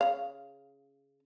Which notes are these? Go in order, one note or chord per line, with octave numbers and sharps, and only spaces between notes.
C#3 F5